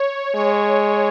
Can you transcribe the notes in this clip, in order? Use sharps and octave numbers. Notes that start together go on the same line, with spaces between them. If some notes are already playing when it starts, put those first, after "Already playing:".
Already playing: C#5
G#3 C#5